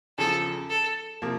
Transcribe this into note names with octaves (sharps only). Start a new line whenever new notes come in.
E2 C#3 F3 A4
A4
C3 F3 A#3